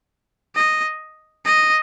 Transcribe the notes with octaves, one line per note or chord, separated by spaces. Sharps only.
D#5
D#5